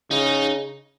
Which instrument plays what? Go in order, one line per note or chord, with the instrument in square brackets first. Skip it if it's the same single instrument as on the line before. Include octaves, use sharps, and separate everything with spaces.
[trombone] C#3 [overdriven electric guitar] D#4